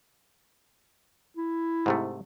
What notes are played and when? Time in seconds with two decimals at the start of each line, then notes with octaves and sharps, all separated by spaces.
1.37 E4
1.86 G#2 C3 A3